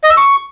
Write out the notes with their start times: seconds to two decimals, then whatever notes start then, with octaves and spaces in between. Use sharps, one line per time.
0.03 D#5
0.10 E6
0.17 C#6